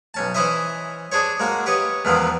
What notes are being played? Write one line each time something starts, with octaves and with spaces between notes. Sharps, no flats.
B1 C#4 A5
E3 C#4 E4 C5 D#5 E5
D4 G#4 C5 C#5
G#3 A#3 F#4
G4 B4 C#5 D#5
E2 G#2 D#3 F3 B3 C4